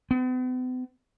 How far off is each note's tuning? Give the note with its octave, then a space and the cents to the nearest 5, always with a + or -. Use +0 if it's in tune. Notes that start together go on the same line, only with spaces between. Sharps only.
B3 +45